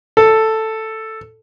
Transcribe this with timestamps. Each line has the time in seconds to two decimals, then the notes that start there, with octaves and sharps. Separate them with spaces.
0.17 A4